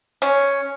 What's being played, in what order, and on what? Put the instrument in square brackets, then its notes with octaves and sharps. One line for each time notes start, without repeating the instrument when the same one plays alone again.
[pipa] C#4